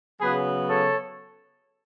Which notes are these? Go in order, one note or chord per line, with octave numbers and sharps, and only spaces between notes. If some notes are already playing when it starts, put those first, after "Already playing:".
C#3 F#3 B3 G#4 B4
A4 C#5